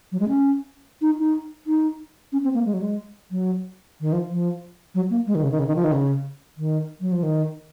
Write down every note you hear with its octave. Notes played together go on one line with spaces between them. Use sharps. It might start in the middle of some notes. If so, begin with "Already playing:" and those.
F#3
G#3
C#4
D#4
D#4
D#4
C#4
C4
A#3
G#3
F#3
G#3
F#3
D#3
F3
F3
F#3
A#3
G#3
D#3
C#3
D#3
C#3
D#3
F3
D#3
C#3
D#3
F#3
F3
D#3